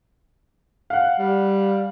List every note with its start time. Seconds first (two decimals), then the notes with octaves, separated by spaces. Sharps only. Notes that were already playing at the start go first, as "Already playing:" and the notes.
0.90 F5 F#5
1.19 G3